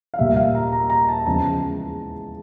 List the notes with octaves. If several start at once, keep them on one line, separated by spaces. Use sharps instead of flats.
F5
A#2 G3 E5
F5
A#5
A#5
A#5
A5
E2 C#3 F3 G#3 A5